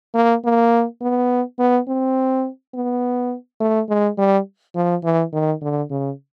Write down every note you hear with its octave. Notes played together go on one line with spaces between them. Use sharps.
A#3
A#3
B3
B3
C4
B3
A3
G#3
G3
F3
E3
D#3
D3
C#3